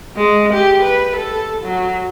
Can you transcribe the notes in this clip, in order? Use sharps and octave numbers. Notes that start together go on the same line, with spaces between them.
G#3
G4
B4
A4
F#3